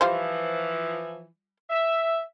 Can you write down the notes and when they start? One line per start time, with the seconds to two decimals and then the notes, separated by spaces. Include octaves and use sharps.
0.01 E3 F3 G3 F4 C5
1.70 E5